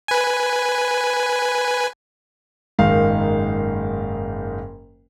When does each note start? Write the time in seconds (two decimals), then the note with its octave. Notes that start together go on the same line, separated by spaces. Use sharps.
0.08 B4 G#5
2.79 F#1 G#2 D#3 F5